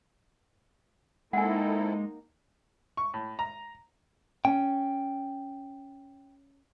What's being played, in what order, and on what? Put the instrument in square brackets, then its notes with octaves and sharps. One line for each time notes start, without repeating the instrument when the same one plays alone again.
[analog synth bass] G#3 [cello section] A#3 D#4 [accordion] C4 E4 A4 [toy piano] F#5 G#5
[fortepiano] C#6
A2
A#5
[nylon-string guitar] C#4 [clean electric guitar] G5